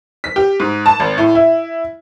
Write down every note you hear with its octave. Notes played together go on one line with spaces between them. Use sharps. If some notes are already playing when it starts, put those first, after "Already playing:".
B6
G4
G#2
A5
G#1
A2
E4